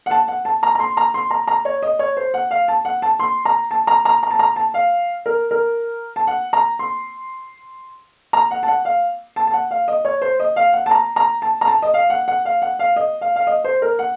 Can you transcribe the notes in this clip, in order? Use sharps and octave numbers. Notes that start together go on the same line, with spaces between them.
F#5
A5
F#5
A5
A#5
A#5
C6
A#5
C6
A#5
A#5
C#5
D#5
C#5
C5
F#5
F5
A5
F#5
A5
C6
A#5
A5
A#5
A#5
A#5
A5
A#5
A5
F5
A#4
A#4
A5
F#5
A#5
C6
A#5
F#5
A5
F#5
F5
A5
A5
F#5
F5
D#5
C#5
C5
D#5
F5
F#5
A5
A#5
A#5
A5
A#5
A5
D#5
F5
F#5
F#5
F5
F#5
F5
D#5
F5
F5
D#5
C5
A#4
F#5